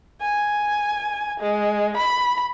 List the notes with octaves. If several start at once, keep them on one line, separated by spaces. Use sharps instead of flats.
G#5
G#3
B5